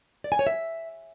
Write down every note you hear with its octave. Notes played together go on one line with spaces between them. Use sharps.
D5
G#5
C#5
E5